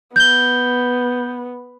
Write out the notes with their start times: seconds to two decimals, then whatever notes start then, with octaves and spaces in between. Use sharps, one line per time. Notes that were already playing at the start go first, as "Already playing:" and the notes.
0.16 B3 G6 G7